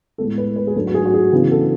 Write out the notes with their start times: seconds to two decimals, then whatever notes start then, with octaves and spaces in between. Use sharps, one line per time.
0.18 A2 G#3 B3 A4
0.38 B4
0.56 B4
0.67 G#4
0.76 G#2 F#3 A3 D4 A4
0.87 F#4
0.94 G#4
1.05 F#4
1.14 G#4
1.32 C#3 E3 B3 D4
1.51 A4